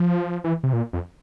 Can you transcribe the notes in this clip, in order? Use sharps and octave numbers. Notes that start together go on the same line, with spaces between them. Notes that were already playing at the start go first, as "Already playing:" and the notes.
Already playing: F3
E3
C3
A#2
F2